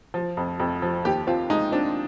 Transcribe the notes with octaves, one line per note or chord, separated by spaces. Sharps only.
F3
F2
F2
F3
D#2 G4
C4 F4
G#3 D#4
C4 D4